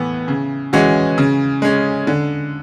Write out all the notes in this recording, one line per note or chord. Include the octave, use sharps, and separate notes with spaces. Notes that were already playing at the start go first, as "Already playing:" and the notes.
Already playing: A2 E3 B3
C#3
E3 G#3 C#4 F#4
C#3
G#3 C#4
D3